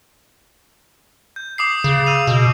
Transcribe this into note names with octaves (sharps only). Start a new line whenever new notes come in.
G6
D6 D#6 C7
C#3
E6 D#7 F7
B2